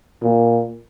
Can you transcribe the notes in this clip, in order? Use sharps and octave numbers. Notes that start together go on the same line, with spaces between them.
A#2